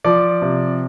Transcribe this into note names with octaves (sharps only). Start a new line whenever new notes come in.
F3 D5 D6
C3